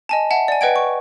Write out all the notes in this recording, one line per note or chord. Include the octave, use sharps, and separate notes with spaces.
D#5 G#5 A5
E5 F#5 A5
D5 G#5
B4 D#5 F#5 G5 G#6 D7
C#6